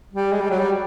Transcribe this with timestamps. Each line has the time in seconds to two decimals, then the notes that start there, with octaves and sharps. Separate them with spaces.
0.13 G3
0.32 G#3
0.41 G3
0.50 F#3
0.59 G3